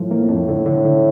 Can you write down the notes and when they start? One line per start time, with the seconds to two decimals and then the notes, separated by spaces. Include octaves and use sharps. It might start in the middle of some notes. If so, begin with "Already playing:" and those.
Already playing: A2 F3
0.11 A#3
0.29 F2
0.48 D3
0.66 D3
0.85 D3